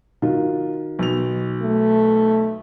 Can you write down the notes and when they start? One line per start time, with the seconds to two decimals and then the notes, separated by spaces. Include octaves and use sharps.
0.22 D#3 F4 F#4
0.99 B1 B2 F7
1.62 A3